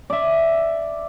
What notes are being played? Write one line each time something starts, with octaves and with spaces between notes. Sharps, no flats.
D5 E5